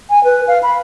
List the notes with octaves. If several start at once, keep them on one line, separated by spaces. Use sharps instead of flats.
G#5
B4
F5
B5